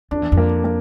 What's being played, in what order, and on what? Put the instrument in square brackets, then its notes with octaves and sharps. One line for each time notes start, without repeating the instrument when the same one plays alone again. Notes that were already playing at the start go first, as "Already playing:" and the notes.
[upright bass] F2 [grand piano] D4
[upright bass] E2
F2
[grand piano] A#3
A#3